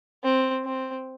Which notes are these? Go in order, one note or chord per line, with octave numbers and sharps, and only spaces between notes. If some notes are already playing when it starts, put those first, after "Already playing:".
C4
C4